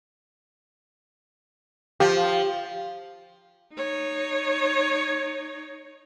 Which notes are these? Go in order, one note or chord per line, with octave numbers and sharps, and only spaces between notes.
F3 G4
D#4 C#5